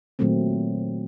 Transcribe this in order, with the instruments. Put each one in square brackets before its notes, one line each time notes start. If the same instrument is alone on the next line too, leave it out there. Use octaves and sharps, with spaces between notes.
[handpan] A#2 D#3 F#3 A3 C4